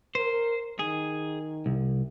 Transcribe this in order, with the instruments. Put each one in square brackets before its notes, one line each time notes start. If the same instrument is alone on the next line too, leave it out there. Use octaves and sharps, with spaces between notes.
[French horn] A#4 [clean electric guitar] C5
[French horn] D#3 [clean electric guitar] G#4
[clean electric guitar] C2